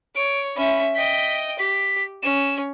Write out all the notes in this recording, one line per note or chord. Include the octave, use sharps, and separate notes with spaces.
C#5 D7
C#4 E5 B5
D#5 G5 B6
G4 B6
C#4 E7